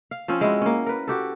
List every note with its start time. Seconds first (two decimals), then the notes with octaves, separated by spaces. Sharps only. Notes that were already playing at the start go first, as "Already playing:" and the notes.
0.11 F5
0.28 F3 C4 C#4
0.41 G#3 E4 F#4
0.62 A#3 C#4
0.86 A#4 B4
1.07 F#4 G4 A4